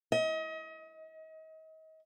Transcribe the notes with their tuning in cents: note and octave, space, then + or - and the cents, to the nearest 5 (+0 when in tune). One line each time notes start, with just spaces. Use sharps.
D#5 +35